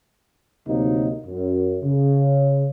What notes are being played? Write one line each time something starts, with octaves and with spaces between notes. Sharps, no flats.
D2 C3 F#3 A#3 D#4
F#2
C#3